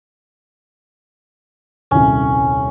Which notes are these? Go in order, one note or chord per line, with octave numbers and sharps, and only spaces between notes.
D#1 C2 C#4